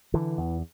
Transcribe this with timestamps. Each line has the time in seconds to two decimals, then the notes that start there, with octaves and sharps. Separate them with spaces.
0.14 D3 E3
0.38 E2